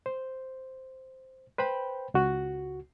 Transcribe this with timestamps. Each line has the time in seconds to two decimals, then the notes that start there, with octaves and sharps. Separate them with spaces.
0.06 C5
1.58 B4 C5 G5 B5
2.14 C#2 F#4